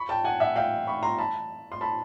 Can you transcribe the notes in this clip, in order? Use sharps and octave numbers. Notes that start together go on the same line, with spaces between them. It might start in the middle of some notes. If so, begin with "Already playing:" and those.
Already playing: B5 C#6
G5 A5
F#5 G#5
E5 F#5
F5 G5
B5 C#6
A#5 C6
A5 B5
C6
A5 B5